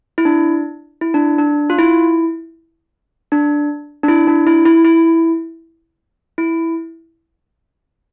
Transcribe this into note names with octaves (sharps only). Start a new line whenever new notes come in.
E4
D4
E4
D4
D4
F4
E4
D4
D4
E4
D4
E4
E4
E4
E4